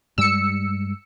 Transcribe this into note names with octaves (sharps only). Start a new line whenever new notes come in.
G2 G3 G#3 E6 C#7